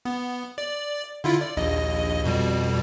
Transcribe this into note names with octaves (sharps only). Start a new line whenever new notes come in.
B3
D5
D3 E4 F4
D5
A#1 D#2 D#5
F2 B2 G3